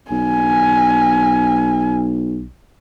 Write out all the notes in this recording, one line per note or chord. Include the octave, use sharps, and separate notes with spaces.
B1 G#5